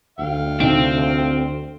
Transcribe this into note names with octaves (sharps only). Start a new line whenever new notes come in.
D2 F5 G5
C3 C4 D#4 D7